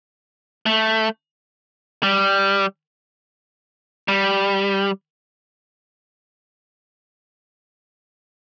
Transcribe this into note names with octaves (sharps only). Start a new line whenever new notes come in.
A3
G3
G3